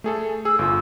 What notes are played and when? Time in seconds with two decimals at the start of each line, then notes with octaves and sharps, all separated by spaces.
0.04 A3 G#4 A4
0.45 G#4 E6
0.59 G1 F4 E6